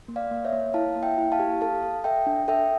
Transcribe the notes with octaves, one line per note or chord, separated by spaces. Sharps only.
A#3
D5 F5
A#3
C#5 E5
A#3
E4 F5 A5
A#3
E5 G5
E4
F5 A5
G4
A4 F5 A5
A4
A4 E5 G5
D4
A4 E5 G5